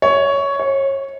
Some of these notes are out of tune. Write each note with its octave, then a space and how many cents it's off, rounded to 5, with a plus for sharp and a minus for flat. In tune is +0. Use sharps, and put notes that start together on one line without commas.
C#5 +10
C#5 -25